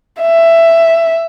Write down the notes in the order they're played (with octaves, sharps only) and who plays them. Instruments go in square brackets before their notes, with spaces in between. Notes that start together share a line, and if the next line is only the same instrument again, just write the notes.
[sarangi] E5